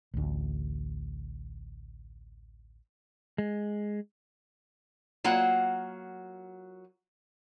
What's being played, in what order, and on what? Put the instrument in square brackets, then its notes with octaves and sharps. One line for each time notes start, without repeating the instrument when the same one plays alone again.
[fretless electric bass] A1 D2
[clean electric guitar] G#3
[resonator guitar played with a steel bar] F#3 A#3 F4 F#5